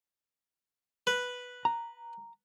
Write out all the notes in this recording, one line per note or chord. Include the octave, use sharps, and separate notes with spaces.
B4
A#5